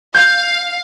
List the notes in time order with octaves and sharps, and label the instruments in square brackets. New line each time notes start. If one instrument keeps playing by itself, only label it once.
[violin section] F5 [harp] G6